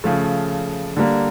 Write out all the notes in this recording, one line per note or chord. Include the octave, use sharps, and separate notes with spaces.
C#3 F3 A3
D3 G3 A#3